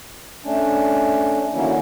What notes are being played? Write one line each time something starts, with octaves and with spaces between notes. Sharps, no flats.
A3 C#4 D4
D3 D#3 F#3 A#3 C#4 E4